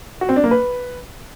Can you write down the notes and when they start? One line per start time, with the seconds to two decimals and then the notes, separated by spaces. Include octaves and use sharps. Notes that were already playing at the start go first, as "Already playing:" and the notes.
0.21 F#4
0.29 C4
0.36 D4
0.44 A#3
0.51 B4